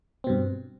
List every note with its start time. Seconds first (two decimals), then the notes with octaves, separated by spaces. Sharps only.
0.24 C4
0.27 B2
0.30 G2